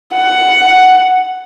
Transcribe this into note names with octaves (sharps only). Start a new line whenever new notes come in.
F#5